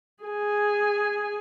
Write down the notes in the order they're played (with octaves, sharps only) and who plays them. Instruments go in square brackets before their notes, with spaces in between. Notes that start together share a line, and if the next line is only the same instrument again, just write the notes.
[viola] G#4 G#5